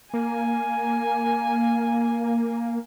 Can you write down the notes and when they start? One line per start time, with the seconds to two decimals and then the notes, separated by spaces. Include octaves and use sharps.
0.14 A#3 G#5